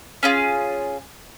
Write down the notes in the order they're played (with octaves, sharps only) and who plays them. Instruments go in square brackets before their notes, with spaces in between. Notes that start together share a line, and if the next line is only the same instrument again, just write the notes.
[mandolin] C#4 F4 G#4